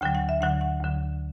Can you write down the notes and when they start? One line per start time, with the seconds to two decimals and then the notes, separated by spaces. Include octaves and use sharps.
0.01 D2 D3 F#3 G5
0.15 F#5
0.29 E5
0.41 D2 D3 F#3 F#5
0.61 F#5
0.81 D2 D3 F#3